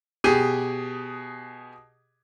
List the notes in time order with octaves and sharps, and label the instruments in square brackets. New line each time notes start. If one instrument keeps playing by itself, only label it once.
[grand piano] B2 G4 G#4 D#7